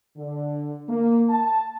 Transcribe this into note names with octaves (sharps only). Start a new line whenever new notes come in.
D3
A#3
A5